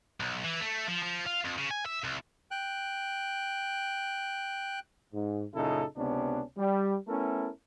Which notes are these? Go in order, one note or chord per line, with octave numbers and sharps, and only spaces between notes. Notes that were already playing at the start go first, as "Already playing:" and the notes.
B1
E3
A3
F3
F3
F4
F2
C#3
G#5
E5
C2
G5 F#6
G#2
F#2 A#2 C#3 D#4 E4 A4
C#2 C3 B3 C#4 D4
G3
A3 B3 C#4 E4 A4 A#4